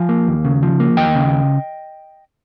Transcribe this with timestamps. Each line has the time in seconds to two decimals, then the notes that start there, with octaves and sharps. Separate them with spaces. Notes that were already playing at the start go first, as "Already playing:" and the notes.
Already playing: F3 F5 G#5
0.09 A#3
0.27 D#2
0.45 C#3
0.63 F3
0.80 A#3
0.97 D#2 D#5 G5
1.15 C#3